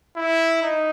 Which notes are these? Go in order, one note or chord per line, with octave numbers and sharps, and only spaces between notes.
E4
D#4